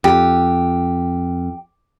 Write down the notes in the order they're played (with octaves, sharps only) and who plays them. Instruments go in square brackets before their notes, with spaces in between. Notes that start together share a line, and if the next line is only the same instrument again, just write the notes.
[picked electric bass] F2 [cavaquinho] G4